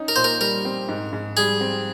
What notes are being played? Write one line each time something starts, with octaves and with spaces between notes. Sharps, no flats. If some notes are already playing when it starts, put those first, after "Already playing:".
Already playing: C#4 D#4
A#4
A#2 C5
A#4
G3 A#4
C4
G#2
G#2
G3 G#4
C4